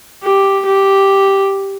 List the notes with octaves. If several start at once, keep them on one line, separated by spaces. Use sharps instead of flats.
G4
G4